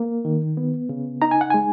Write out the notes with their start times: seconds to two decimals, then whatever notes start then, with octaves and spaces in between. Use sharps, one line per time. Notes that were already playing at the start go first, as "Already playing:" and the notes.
Already playing: A#3
0.25 D#3
0.57 B3
0.89 C#3
1.22 D#4 A#5
1.31 G#5
1.41 F#5
1.50 G#3 G#5